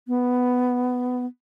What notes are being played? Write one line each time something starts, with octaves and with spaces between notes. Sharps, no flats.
B3